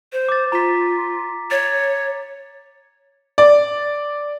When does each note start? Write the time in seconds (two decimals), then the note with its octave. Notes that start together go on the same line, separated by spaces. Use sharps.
0.12 C5
0.29 D6 A6
0.52 F4 A#5 B6
1.51 C#5 A6
3.38 D5